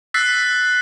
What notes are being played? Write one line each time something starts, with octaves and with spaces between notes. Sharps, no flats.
E6 F#6 A6 B6 C7